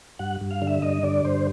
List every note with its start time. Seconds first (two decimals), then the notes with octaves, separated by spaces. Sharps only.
0.19 G2 F#5
0.41 G2
0.51 F5
0.62 D3
0.67 E5
0.82 G2 D#5
1.03 D3 D5
1.25 G2 C5